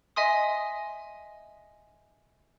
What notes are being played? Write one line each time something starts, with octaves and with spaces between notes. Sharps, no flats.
D#5 E5 G#5 C6 D#6